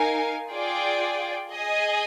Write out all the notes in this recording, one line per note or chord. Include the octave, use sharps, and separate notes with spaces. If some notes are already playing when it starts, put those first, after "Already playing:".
Already playing: D#4 A#4 F5 G#5
F4 G#4 D5 G5
G#4 D#5 G#5